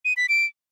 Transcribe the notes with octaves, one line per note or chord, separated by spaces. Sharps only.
D#7
B6
D7